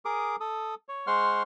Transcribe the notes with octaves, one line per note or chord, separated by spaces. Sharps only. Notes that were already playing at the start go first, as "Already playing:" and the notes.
G#4 A#4 D6 D#6
A4 D#6
C#5
G#3 C5 F#5 C6 C#6 F6